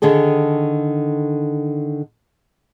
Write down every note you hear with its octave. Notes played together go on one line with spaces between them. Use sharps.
D3 D#3 G#4 A4